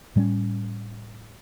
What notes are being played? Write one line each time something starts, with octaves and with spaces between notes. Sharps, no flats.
A2 G3 C4 C#4